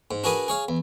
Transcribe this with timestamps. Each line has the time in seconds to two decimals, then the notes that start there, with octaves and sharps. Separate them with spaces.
0.11 G#2
0.24 D4 F#4 G#4 A#4 B4 D#6
0.48 G#4 C#5 F5
0.69 E2